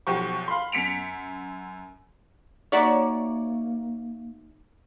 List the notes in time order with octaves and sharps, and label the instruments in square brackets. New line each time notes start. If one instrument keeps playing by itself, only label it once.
[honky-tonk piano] B1 F3 F#4 G4 C#6
F5 B5 C6
F#2 B6 C#7 D7 F7
[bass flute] A#3 [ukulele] D#4 F#4 E5 [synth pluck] C#5 D5